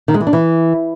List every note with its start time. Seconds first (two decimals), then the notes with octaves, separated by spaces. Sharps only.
0.08 D#3
0.14 G#3
0.21 E3
0.27 D4
0.33 E3